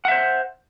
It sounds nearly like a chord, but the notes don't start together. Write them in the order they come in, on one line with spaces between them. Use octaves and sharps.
F#5 E5 C5